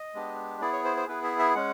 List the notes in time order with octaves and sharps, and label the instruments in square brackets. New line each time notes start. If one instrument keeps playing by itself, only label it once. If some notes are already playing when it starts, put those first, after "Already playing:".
Already playing: [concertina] D#5
G#3 B3 D4 G4
B3 E4 G#4 D5
C#5
C5
C5
B3 E4 G#4 B4
E5
E5
G#3 C#4 F#5